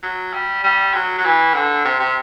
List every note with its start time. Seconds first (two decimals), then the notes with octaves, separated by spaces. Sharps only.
0.03 F#3
0.34 G3
0.64 G3
0.94 F#3
1.19 F#3
1.24 E3
1.55 D3
1.85 C3
2.00 C3